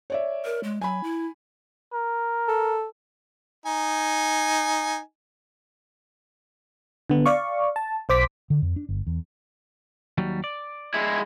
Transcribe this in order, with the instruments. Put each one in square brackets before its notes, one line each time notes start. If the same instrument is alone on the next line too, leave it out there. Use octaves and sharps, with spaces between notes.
[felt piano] C#5 D5 E5
[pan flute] A#4
G#3
[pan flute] F#3 [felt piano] G#5 B5
[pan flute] E4
[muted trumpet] A#4
[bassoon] A4
[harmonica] D#4 G#5
[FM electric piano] D3 B3
D5 F5 C#6
A5
B1 C5 D6 B6
[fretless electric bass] D3
F2
D4
G1
E2
[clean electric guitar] D#2 F#3 G3
D5
[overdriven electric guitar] G#3 E4